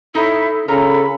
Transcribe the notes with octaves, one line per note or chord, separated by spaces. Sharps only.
D#4 E4 A4 C#5
C#3 F4 A4 A#4 A#5 B5